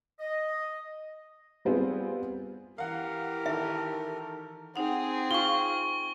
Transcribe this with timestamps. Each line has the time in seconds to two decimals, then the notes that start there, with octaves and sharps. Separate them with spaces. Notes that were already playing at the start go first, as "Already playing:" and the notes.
0.20 D#5
1.65 G3 B3 C4 F4 G#4
2.78 E3 G4 A#4 F5 F#5
3.46 D#3 A4 E5
4.76 C4 D#4 G#4 F#5
5.31 F4 C#6 G7